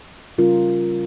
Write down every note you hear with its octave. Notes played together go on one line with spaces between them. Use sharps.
C#3 G3 C#4 F4 A#4